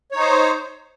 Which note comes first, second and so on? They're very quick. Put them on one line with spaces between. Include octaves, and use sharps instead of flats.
C#5 D#4 C5